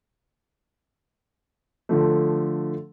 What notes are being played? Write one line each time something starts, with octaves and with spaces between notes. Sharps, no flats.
D3 F3 A3